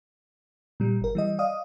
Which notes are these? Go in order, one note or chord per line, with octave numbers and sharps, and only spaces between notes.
A#2 G3
G1 A#4
E3 G3 D#5
D5 D#5 F5 D#6